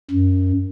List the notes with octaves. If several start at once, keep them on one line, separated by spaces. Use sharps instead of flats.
F#2